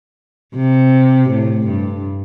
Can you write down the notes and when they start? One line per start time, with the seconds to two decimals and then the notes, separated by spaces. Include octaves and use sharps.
0.55 C3
1.29 A2
1.66 G2